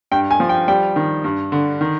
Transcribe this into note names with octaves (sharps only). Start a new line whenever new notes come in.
G2 G5
G#5
F3
G5
G3 G5
D#3
G2
D3
D#3